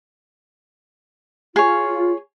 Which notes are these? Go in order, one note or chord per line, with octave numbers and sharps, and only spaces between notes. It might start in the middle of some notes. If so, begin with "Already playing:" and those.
F4 G#4 C#5